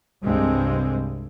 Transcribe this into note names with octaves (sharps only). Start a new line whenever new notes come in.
C2 G2 G3 G#3 C4